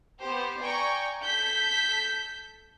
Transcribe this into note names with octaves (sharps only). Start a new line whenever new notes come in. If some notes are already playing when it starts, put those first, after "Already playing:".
B3 G4 C5
D5 G5 G#5 A#5 C#6
A4 G6 B6